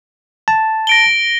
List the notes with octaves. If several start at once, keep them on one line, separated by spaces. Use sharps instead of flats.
A5
A#6 D7 G7